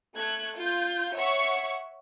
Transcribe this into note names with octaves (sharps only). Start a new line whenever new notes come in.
A3 F#6 G#6
F4 G6
C#5 E5 F#5 C#6